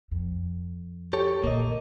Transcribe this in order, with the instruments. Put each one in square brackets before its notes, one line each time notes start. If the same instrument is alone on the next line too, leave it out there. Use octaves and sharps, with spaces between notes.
[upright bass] F2
[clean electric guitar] G4 A4 C#5
[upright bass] A#2 D3 [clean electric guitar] A#3 D#5